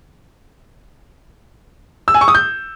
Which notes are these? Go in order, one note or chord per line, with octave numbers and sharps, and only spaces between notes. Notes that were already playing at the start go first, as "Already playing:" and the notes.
E6
G#5
C#6
D#6
G6